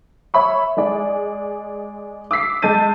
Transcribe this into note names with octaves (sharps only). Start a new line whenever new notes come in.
C#5 E5 B5 C#6
G#3 G#4 D5
D6 E6 B6 C7
G#3 A5 G6 A6 D#7